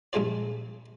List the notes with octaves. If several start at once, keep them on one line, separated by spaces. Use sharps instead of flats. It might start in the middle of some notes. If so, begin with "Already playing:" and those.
A#1 G2 G#3 F4 D5